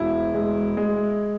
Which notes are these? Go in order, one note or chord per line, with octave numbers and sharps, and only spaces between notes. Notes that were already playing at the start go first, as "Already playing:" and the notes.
Already playing: E1 E4
G#3
G#3